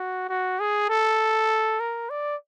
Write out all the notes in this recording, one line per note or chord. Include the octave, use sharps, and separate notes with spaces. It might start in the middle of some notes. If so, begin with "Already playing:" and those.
Already playing: F#4
F#4
G#4
A4
A#4
D5